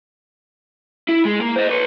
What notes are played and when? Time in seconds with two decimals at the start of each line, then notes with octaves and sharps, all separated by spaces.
1.09 E4
1.25 G#3
1.41 A#3
1.56 C5 D#5
1.69 B4 C#5